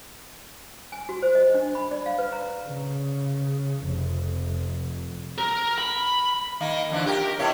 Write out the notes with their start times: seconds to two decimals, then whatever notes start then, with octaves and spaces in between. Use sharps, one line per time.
0.92 G#5
1.09 F#4
1.22 C5
1.35 D#5
1.54 D4
1.75 B5
1.91 D5
2.06 F5
2.19 B4
2.33 A#5
2.67 C#3
3.84 F1
5.38 A#4
5.78 B5
6.60 D#3 A#3 D#4
6.90 F2 D3 E3
7.06 G4 A#4
7.39 B2 E4 C#5